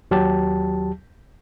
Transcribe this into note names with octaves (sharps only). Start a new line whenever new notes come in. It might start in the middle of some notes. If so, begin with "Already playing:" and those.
D#2 F#3 G4 A5